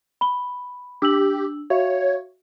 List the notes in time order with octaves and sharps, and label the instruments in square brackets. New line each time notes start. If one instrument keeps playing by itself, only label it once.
[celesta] B5 G7
[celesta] D4 E6 F#7 [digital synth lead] G4
[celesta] F#4 E5 F5 [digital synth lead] C#5